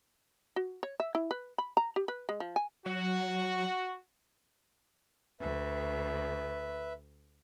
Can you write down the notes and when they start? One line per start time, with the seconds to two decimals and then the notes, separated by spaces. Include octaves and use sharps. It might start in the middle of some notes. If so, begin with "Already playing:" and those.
0.56 F#4
0.83 C#5
1.00 E5
1.15 E4
1.31 B4
1.58 B5
1.77 A#5
1.96 G4
2.08 B4
2.29 G#3
2.40 F3
2.56 G#5
2.86 F#3 F#4
5.41 D2 B4 E5